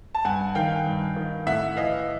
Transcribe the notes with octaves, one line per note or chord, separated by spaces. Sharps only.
A5
G2 F#5 G#5
D#3 F5 G5
G2
D#3
A2 E5 F#5
E3 D#5 F5